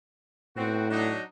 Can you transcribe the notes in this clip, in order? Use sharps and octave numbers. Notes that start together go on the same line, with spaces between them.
A2 B3 C4 F#4
F#3 D4 D#4